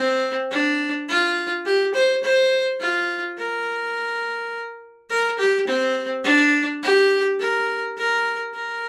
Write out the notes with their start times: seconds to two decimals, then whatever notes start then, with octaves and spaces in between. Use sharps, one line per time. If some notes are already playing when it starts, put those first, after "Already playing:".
Already playing: C4
0.51 D4
1.09 F4
1.66 G4
1.94 C5
2.23 C5
2.80 F4
3.38 A#4
5.10 A#4
5.39 G4
5.67 C4
6.24 D4
6.83 G4
7.39 A#4
7.98 A#4
8.54 A#4